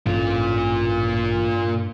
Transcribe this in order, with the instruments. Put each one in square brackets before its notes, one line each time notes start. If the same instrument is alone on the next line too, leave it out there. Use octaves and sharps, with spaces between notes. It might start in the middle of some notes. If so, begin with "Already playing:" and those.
[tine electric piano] A1 [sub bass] G2 [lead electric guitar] A#2 F4